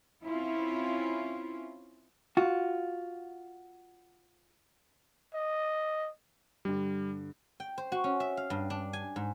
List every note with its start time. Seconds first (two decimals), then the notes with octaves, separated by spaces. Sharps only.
0.23 C4 C#4 E4 F4
2.37 F4 F#4
5.34 D#5
6.65 G2 D3 G3
7.60 G5
7.78 C5
7.92 F#4
8.04 C#4
8.20 E5
8.37 F5
8.50 G2
8.70 D4
8.93 G#5
9.16 G#2